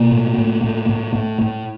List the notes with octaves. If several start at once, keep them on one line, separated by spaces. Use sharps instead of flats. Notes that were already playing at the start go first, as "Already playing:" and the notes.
Already playing: B2 A#3
A2
A2
A2
A2
A2
A2